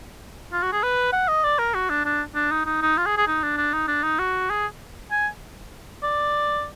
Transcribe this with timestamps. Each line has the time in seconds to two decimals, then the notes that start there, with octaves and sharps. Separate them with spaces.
0.53 F4
0.63 F#4
0.72 G#4
0.83 B4
1.13 F#5
1.28 D#5
1.44 D5
1.59 A#4
1.74 F#4
1.90 D4
2.06 D4
2.35 D4
2.52 D#4
2.66 D#4
2.82 D#4
2.97 F4
3.06 G#4
3.18 G#4
3.28 D#4
3.43 D4
3.57 D4
3.74 D#4
3.88 D4
4.03 D#4
4.19 F#4
4.50 G#4
5.11 G#5
6.03 D5